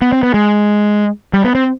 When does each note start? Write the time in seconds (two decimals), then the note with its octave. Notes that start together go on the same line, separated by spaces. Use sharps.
0.02 B3
0.12 C4
0.23 B3
0.34 G#3
1.33 G3
1.44 B3
1.55 C4